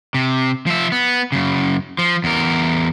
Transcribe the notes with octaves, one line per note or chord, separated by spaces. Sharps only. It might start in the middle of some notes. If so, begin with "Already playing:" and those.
C3
F3 E5
B3
F#2 C#3
F3
E2 A#4